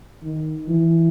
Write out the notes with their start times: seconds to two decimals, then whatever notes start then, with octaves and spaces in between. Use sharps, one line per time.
0.23 D#3
0.68 E3